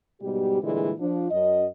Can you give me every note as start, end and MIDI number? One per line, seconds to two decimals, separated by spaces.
0.21 0.60 44
0.21 0.60 47
0.21 0.60 55
0.21 0.60 67
0.63 0.92 46
0.63 0.92 50
0.63 0.92 52
0.63 0.92 55
0.63 0.92 56
1.00 1.31 53
1.00 1.31 62
1.31 1.67 42
1.31 1.67 75